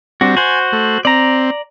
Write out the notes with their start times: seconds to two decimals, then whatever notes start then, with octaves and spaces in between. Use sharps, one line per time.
0.21 G3 C4 D4 F#4
0.37 F#4 C5 G#5
0.72 A3
1.05 C4 D5 A#5